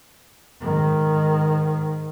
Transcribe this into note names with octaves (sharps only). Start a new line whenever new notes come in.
G#2 D#3